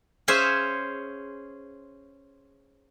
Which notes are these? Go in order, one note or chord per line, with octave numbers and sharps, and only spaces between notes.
C#4 G#4 C5 C#5 E5 F5